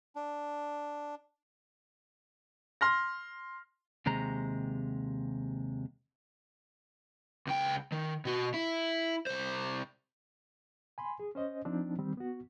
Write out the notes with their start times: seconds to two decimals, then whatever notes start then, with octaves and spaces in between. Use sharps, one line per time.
0.16 D4
2.81 C6 F6 A#6
4.06 D#2 C3 G#3 A#5
7.47 C#2 G5
7.92 D#3
8.25 B2 F#4
8.54 E4
9.27 C2 C5
10.98 G#5 B5 C6
11.20 G#4
11.35 C#4 C5 D#5
11.65 F3 C4 D4 D#4
11.99 D#3 G3 C4
12.17 B3 F#4